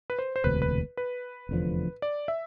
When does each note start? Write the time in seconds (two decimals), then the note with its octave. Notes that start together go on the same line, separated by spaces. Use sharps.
0.10 B4
0.19 C5
0.36 C5
0.44 E1 D2 C3 B4
0.62 B4
0.97 B4
1.49 F1 E2 D3 F3
2.02 D5
2.28 E5